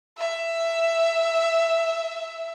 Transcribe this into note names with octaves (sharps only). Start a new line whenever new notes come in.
E5